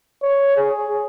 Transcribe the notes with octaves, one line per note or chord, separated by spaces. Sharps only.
C#5
G#4